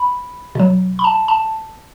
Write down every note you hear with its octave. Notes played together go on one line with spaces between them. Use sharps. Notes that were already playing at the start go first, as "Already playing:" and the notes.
Already playing: B5
B2 F#3
B5
A5
A5